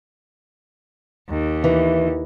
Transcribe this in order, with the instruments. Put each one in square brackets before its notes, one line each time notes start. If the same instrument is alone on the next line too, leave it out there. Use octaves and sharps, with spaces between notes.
[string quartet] D#2
[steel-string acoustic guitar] E3